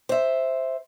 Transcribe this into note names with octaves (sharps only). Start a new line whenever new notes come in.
C5 E5